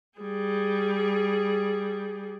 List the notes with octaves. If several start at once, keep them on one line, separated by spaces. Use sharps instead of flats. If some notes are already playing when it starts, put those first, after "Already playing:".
G3 G#4